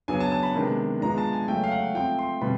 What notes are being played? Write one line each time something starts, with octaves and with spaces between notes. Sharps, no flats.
C#3 F#3 B3 D4 G#5
A5
A5
B5
C3 D#3 G#3 B3 D4
F3 G#3 B3 D4 A#5
A5
G#5
C#3 F#3 A3 G5
F5
F#5
F3 A3 C4 G5
C6
B2 G3 C4 B5